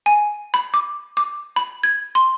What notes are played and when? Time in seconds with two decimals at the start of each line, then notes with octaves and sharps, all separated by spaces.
0.06 G#5
0.54 B5
0.74 D6
1.17 D6
1.56 B5
1.83 G#6
2.15 C6